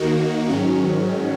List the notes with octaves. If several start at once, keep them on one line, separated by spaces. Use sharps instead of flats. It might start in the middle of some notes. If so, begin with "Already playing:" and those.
Already playing: D#2 D#3 A#3 D#4 F#4
G#2 D#3 F#3 C#4